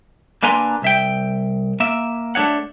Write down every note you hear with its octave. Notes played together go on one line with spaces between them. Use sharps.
D3 A#3 B4 G#5 A#5 C6
C2 E5 G5
A#3 E5
A3 D4 D#4 C#5 F#5